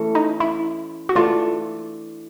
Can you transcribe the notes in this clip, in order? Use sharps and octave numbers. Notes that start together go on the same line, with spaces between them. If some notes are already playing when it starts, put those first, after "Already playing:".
Already playing: E3 A3 C#4
D#4
E4
F#4
E3 A3 D4 F4